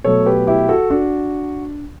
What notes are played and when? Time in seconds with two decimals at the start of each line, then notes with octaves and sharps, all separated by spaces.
0.04 B2 F#3 A3 A4 C#5
0.26 G4 B4
0.47 E4 G4
0.69 F#4 A4
0.90 D4 F#4